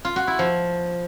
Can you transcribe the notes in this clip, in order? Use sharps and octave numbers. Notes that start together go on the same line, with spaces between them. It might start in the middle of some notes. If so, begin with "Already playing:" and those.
F4
F#4
E4
F3